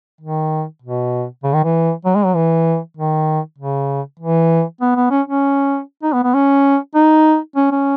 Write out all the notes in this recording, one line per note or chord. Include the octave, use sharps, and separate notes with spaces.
D#3
B2
C#3
D#3
E3
F#3
G#3
F#3
E3
D#3
C#3
E3
B3
B3
C#4
C#4
D#4
B3
B3
C#4
D#4
C#4
C#4